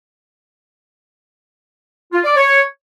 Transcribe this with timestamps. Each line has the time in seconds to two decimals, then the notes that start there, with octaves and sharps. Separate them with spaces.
2.13 F4
2.24 D5
2.36 C#5